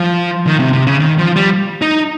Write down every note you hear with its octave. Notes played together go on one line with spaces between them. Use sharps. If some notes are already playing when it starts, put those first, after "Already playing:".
Already playing: F3
D#3
C3
C3
C#3
D#3
F3
G3
D#4